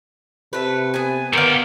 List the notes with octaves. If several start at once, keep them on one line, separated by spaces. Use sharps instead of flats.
C3 A3 B4
B3 G#5
D3 D#3 B3 G4 F5